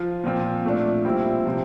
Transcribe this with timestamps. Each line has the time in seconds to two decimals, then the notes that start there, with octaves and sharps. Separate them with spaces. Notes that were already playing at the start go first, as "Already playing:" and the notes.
Already playing: F3 F4
0.24 A#2 F3 C4 F4
0.64 A#2 A3 D4
1.05 A#2 G3 C4 E4
1.45 C3 F3 C4